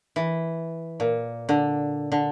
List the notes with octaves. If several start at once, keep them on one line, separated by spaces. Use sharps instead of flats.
E3
A#2
D3
D3